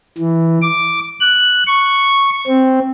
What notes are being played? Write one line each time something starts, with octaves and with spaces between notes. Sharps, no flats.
E3
D6
F#6
C#6
C4